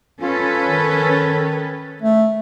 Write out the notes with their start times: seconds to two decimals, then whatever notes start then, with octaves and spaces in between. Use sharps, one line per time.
0.22 C#4 F4 A4 B4
0.68 D#3
2.02 A3